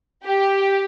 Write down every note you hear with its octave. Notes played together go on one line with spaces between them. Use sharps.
G4